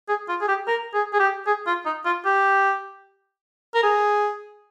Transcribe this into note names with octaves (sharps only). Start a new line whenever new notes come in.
G#4
F4
G#4
G4
A#4
G#4
G#4
G4
G#4
F4
D#4
F4
G4
A#4
G#4